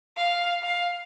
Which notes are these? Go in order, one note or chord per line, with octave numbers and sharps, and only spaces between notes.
F5
F5